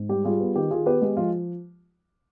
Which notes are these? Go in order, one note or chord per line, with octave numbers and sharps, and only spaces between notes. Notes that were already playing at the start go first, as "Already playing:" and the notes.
Already playing: G#2
G3 G4
G3 F4 G#4
B3
D#3 G4
D#3 F4 G#4
B3 G4 B4
G#3 G4
F3 F4